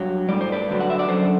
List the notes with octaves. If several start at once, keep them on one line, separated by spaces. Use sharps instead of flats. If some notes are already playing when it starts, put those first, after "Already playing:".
Already playing: G2 F#3
A2 G3 D5
C5
B4 D5
G2 D3 F#3
F#5
E5
D5
F#2 D3 F#3 A4 C5